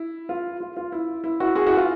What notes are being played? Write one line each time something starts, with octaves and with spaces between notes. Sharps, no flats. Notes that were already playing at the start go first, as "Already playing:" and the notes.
Already playing: E4
F4
F4
F4
E4
E4
E4 F#4
F#4 G#4
E4 F#4
F4